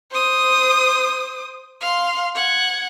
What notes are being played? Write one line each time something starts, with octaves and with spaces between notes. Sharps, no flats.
C5 D#6
F5 C6
F#5 G#6